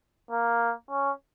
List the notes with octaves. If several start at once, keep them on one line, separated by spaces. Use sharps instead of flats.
A#3
C#4